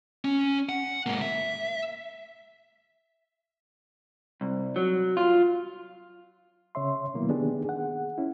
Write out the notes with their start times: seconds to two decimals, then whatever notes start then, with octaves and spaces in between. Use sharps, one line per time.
0.25 C#4
0.69 F#5
1.06 G#2 A#3
1.22 E5
4.41 C2
4.76 F#3
5.17 F4
6.75 C#3 C#5 E5 C6
7.14 B2 D#3 F#3 A#3 B3 E4
7.29 D#3 B3 D4 G4 G#4
7.65 G#4 F#5
8.18 C#4 E4